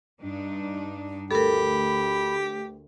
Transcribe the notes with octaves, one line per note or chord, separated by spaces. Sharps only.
G2 D4 D#4
D2 G4 A4 A#4 B5